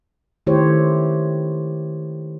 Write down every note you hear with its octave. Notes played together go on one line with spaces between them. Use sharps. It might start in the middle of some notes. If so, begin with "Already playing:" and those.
D#3 A3 E4 G4 C5 C#5